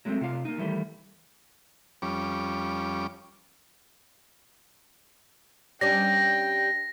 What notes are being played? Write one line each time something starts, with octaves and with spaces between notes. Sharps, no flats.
F#3 G#3 A3 B3 C4
C3 F4 F5
A#3 D#4
D#3 E3 G3 A3
F2 G3 C#4 D6
G3 C#4 D4 G5 A#6